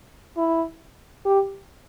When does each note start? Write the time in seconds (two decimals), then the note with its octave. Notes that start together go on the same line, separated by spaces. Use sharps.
0.37 E4
1.25 G4